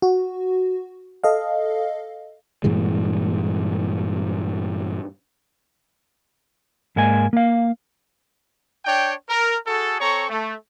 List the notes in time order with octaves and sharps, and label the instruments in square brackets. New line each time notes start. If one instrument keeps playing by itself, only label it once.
[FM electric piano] F#4
A4 D#5 F5
[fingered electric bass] G2 A#2 E3 G#3
[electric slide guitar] G#2 G#3 A#3 G#5
A#3 F5
[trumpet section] D4 C#5 G5
A#4
F#4 G#4 A4
C4 A4 C#5 A#5 C#6
A3